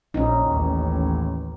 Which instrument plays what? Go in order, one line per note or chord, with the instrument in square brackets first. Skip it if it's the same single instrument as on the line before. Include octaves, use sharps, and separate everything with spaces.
[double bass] A#1 [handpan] C#4 D#4
[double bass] A1 D#2